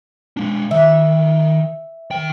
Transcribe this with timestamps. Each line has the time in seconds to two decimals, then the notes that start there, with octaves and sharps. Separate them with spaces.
0.37 G#3 D4
0.71 D#3 E5
2.11 D#3 G5